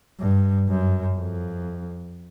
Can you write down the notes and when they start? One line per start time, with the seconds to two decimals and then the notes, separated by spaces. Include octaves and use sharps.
0.20 G2
0.68 F#2
1.17 F2